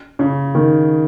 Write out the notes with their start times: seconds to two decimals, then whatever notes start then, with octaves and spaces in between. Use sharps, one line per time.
0.19 C#3
0.55 D#3